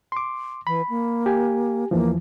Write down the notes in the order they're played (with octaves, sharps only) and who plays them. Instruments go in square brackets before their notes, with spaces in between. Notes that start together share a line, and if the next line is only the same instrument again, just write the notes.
[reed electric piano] C6 D6
[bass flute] E3 [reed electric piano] B5
[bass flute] A#3
[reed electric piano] G4 G#5
[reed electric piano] E2 E3 F3 [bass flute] A#3